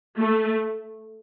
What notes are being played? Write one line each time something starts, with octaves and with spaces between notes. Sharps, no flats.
A3